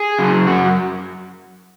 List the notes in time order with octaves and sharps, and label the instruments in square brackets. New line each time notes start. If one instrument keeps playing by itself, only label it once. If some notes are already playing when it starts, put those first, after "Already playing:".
Already playing: [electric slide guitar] G#4
C#3 F#3
F#2 F#4